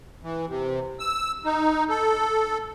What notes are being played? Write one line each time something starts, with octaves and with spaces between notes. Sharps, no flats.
E3
C3
E6
D#4
A4